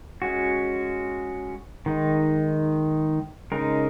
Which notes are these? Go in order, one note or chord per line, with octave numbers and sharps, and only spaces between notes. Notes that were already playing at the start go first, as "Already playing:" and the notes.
G#3 C#4 F#4
D#3 G#3 D#4
C#3 G#3 D#4 A#4